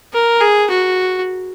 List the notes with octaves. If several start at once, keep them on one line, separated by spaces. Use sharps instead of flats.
A#4
G#4
F#4